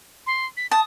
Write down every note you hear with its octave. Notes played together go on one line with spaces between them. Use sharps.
C6
B6
A5 D#6